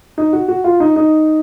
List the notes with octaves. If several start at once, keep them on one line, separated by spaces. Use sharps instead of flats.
D#4
F#4
F#4
F4
D#4
D#4